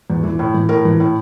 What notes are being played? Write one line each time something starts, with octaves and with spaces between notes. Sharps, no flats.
E2
E3
A2
E3
A2 A#4
E3
A2